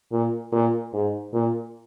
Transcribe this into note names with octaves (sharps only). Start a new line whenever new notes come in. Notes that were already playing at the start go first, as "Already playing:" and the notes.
A#2
A#2
G#2
A#2